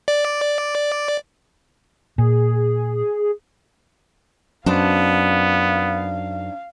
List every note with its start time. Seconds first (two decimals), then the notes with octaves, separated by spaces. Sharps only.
0.08 D5
2.18 A#2 G#4
4.66 F#2 B3 D4 D#4 C5 F5